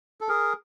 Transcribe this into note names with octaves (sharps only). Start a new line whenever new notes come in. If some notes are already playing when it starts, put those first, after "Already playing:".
A4
G#4 A#4